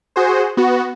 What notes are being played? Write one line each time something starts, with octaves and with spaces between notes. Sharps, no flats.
F#4 G#4 C5
B3 F#4